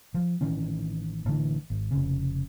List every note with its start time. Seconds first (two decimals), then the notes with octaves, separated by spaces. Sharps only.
0.14 F3
0.41 A1 D#3 E3 C#4
1.26 A1 D3 E3
1.70 G#1
1.91 F1 C#3